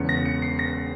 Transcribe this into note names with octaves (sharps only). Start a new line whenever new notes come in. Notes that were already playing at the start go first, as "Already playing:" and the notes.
Already playing: E1 E2 C#3 C#7
A#6
C#7
C7
A#6